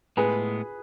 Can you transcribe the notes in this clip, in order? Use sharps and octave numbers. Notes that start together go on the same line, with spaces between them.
A2 G#3 B3 G#4 B4